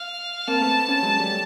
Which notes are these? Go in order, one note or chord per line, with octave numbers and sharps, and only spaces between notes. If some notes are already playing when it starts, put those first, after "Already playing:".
Already playing: F5
A#3 C4 A5
A3 B3
B3 C#4
F#3 G#3
G3 A3